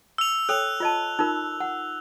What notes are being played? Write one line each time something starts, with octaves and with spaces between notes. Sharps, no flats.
E6 F7
A4 C#5 G5 F#6 F7
F4 D#5 A5
D#4 F4 A#4
F#5